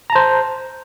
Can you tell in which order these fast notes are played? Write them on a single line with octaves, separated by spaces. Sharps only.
A#5 A5 C5